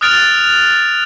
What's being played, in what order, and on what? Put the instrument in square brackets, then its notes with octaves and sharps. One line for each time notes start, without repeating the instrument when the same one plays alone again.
[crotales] D#6 F6 F#6 A6 D7 F7